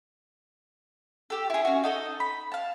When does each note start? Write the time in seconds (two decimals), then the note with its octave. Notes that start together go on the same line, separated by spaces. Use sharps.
1.30 G4 A4
1.50 E4 G#4
1.65 C#4 F#4
1.84 D#4 A4 D#5
2.20 B5
2.52 F5 A5